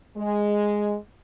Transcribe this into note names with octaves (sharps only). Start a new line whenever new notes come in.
G#3